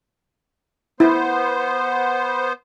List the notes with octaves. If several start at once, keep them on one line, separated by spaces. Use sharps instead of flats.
B3 E4 C5